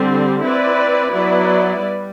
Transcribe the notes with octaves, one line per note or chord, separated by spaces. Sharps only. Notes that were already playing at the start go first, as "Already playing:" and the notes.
Already playing: D3 G3 C4 G4
C4 E4 B4 D5
F#3 B3 E4 B4 D5
G3